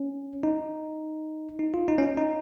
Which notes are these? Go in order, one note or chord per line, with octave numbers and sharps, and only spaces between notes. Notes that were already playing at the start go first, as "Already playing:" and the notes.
Already playing: C#4
D#4
D#4
F4
D#4
C#4
D#4
D#4